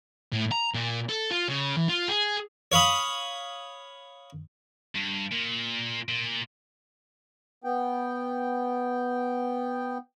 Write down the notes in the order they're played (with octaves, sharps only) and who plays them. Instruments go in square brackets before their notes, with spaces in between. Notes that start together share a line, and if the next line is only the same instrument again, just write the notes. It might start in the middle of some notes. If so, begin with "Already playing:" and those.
[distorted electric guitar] A2
A#5
A#2
A4
F4
C#3
E3
F4
G#4
[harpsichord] C#5 F5 B5 D#6
[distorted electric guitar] G2
A#2
A#2
[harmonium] B3 G5